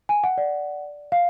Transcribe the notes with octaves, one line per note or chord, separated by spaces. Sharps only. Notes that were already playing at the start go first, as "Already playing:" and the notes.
G#5
F#5
D5
F5